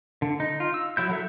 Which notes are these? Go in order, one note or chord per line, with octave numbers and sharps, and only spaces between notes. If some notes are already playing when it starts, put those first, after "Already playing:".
D3
D#4
F4
E6
F#3 E4 G6
F#3 A4 E5